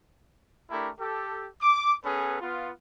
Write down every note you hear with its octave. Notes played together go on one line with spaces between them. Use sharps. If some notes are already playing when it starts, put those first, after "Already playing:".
A3 D4 E4 G4 A#4
G4 A4
D6
B3 C#4 G#4 A4 B4
B3 F4